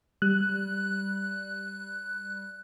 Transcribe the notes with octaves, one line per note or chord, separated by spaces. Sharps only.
G3 F#6